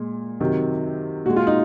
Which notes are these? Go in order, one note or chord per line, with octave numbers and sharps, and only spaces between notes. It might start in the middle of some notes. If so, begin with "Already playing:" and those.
Already playing: A#2 G#3
C3 D#3 F#3
A#2 G#3 F#4
F4
D#4